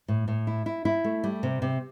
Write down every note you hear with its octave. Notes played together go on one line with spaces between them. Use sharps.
A2
A2
E4
E4
E4
A3
G3
C3
C3